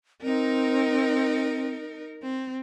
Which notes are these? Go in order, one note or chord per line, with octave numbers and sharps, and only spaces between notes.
C4 D#4 A#4
C4